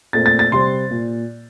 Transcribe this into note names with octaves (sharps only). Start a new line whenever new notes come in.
A#2 A3 C4 A6
A6
A6
C3 G3 C4 C6
A#2